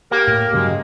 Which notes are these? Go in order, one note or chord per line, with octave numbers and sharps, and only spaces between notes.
A#3 G4 A#4
A2
G2 C#3 F#3 G#3